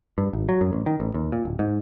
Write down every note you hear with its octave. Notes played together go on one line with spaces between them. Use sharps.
G2
G#1
F#3
F#2
A1
D#3
A1
D#2
A#2
D1
G#2